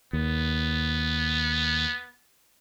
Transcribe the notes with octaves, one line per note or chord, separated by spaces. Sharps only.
D#2 B3